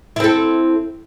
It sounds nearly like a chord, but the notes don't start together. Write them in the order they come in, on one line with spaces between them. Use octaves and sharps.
E4 C4 A4